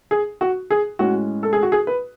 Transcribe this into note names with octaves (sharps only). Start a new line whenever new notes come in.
G#4
F#4
G#4
A2 G#3 C#4 F#4
A4
G#4
F#4
G#4
B4